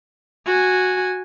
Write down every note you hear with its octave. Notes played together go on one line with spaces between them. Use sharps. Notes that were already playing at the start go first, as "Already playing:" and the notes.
F#4 G#5